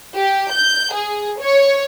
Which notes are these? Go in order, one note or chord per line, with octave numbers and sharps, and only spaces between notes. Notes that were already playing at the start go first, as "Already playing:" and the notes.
G4
G6
G#4
C#5